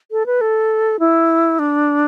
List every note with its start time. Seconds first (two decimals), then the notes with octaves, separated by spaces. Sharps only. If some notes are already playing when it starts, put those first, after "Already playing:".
0.11 A4
0.26 B4
0.41 A4
1.00 E4
1.59 D4